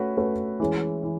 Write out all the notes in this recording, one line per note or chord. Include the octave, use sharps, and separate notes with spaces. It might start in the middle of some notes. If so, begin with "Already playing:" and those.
Already playing: A3 C#4 F#4 B4
A3 C#4 F#4 B4
E3 G#3 C#4
E3